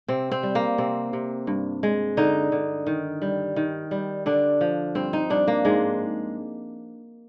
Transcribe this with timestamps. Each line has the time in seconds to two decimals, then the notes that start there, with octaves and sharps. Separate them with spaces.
0.08 C3 C4
0.31 C4
0.43 G3
0.55 A#3
0.78 C3 C4
1.13 C3
1.47 G2
1.83 G#3
2.17 D3 D#4
2.52 D3
2.87 D#3
3.22 G3
3.56 D#3
3.91 G3
4.26 D3 D4
4.61 F3
4.95 G2 C4
5.13 D#4
5.30 G2 D4
5.48 A#3
5.65 G#2 G#3